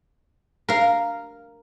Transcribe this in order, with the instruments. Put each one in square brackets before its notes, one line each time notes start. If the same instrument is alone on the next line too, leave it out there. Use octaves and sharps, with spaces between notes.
[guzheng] A#4 F5